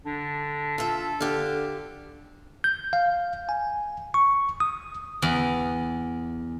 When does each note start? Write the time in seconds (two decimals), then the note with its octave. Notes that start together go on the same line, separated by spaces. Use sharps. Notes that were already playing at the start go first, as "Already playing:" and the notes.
0.06 D3 D4
0.78 F4 A4 E5
1.21 D3 G4 F5
2.64 G6
2.93 F5
3.49 G#5
4.14 C#6
4.60 D#6
5.22 E2